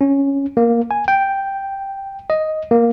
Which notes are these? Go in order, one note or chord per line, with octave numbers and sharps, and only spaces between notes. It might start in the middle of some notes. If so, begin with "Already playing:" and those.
C#4
A#3
G#5
G5
D#5
A#3